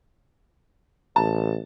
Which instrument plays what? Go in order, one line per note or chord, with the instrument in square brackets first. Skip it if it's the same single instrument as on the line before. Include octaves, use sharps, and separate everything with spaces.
[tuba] A1 [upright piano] A5